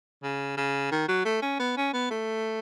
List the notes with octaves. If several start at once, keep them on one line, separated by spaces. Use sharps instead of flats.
C#3
C#3
D#3
F#3
A3
C#4
B3
C#4
B3
A3